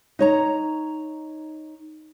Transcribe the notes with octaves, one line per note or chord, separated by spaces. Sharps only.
D#4 C#5 A#5